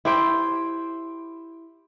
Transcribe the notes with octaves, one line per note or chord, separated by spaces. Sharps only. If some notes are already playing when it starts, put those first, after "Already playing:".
E4 G4 C5 G5